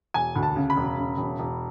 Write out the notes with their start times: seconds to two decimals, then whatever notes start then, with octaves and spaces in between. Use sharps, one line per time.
0.14 E1 G#5
0.36 D2
0.43 A5
0.56 C#3
0.70 B5
0.76 E1
0.97 C#3
1.18 E1
1.39 E1